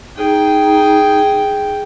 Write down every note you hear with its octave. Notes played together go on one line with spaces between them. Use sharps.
D#4 G#4 G5